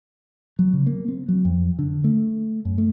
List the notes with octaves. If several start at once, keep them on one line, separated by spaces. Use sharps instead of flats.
F#3
C#3
A#3
C4
F#3
F2
D3
A3
F#2
A3